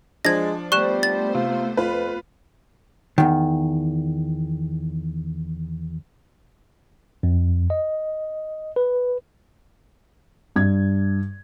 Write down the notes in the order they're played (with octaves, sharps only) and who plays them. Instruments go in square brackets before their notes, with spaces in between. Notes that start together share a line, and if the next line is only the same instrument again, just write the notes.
[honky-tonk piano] F3 D4 [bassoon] G#3 [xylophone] G#6 A#6
[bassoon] G3 [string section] A3 B3 C5 [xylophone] C#6 F#6 E7
[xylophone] A6
[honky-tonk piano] C3 [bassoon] F4
[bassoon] F2 [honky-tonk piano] F4 B4
[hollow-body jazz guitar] E2 D#3
[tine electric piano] F2
D#5
B4
[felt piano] G2 G#6